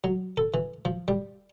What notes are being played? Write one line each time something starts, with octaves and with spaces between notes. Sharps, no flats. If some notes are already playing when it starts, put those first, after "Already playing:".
F#3
A4
E3
F3
G3